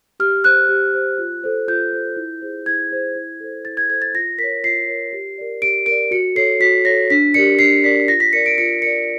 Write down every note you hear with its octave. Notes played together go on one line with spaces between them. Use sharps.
G4 F6
C5 F#6
G4
C5
F4
A4 C5
F4 G6
A4 C5
E4
G#4 C5
E4 G#6
G#4 C5
E4
A4 C5
E4 A6
G#6
A4 C5 G#6
A6
F4 A#6
A#4 C#5 B6
F4 C7
A#4 C#5
G4
A#4 D5
G4 D7
A#4 D5 D7
F#4 C#7
A4 C#5 C7
F#4 B6
A4 C#5 A#6
D4 B6
G4 A#4 D5 C#7
D4 C7
G4 A#4 D5 B6
F4 A#6
B6
A#4 D5 C#7
D7
F4 C#7
A#4 D5 C#7